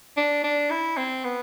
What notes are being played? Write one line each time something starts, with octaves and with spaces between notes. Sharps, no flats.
D4
D4
E4
C4
B3